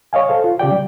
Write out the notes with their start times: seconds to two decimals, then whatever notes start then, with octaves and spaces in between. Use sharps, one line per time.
0.13 C#5 D#5 F5 G#5
0.28 A4 C5 F5
0.44 F4
0.59 C#3 G4 D5 G5
0.72 G3